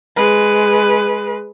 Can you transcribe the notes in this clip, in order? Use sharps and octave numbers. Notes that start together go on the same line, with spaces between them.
G#3 B4